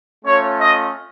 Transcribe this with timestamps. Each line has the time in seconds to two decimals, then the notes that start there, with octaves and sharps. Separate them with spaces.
0.25 A3 C#4 F4 C#5
0.59 D#5